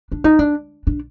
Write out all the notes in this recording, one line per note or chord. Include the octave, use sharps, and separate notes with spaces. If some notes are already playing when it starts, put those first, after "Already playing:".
D4
D#4
D4
D4